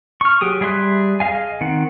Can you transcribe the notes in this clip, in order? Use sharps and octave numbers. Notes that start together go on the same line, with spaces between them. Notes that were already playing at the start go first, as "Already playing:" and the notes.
C#6 F6
F#3 G4 G#4 D#6
G3 G#4 E5 C6 F#6
G#4 D#5 F5 G#5
D#3 C4 F#5